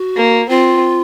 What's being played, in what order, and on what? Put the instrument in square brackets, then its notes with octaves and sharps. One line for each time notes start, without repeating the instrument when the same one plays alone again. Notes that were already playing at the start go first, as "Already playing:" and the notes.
Already playing: [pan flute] F#4
[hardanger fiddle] A#3
[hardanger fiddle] C4 [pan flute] F4